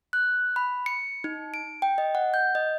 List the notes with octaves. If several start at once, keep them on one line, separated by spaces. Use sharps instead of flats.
F#6
B5
C#7
D#4
D7
G5
D#5
F#5
G6
D#5